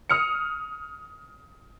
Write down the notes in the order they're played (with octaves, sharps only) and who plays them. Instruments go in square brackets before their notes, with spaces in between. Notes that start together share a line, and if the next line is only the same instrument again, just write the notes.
[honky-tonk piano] D#6 F6 C#7